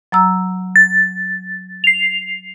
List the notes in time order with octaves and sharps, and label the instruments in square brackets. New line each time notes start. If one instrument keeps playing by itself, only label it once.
[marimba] F#3 A#5 E6
[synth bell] A6
C7 F7